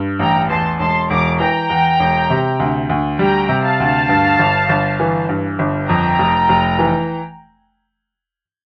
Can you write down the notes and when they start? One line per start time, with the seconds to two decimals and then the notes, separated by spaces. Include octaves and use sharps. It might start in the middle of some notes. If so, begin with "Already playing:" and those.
Already playing: G2
0.19 A1 G5 A#5
0.49 E2 A5 C6
0.79 E1 A5 C6
1.09 E1 A#5 D6
1.39 E3 G5 A#5
1.70 E2
2.00 E1
2.30 C3
2.60 D2
2.89 D2
3.19 G3 G5 A#5
3.49 C3
3.64 F5 A5
3.80 D2
4.09 G2
4.39 G1
4.69 G1
5.00 E3
5.29 G2
5.59 G1
5.89 F2 G5 A#5
6.19 F1
6.49 F1
6.79 E3